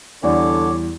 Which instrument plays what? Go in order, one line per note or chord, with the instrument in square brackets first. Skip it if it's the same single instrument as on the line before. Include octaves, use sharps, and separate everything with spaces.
[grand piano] E2 E3 G3 [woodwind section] D3 [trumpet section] C#5 D6